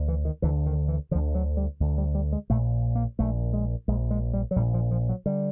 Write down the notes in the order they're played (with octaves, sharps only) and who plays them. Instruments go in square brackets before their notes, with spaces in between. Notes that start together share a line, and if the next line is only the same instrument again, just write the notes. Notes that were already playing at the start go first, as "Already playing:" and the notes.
Already playing: [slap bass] D2 D3
E3
D#3
D2 D3 E3
D#3
E3
D3 F3
D2
F#3
G3
D2 D3
G3
G3
G#3
A#1 A#2 A3
A#3
A#1 A#2 A3
G#3
A#1 G#3
A#2
G#3
G3
F#3
A#1 A#2 G3
F3
F3
F#3
D3 G3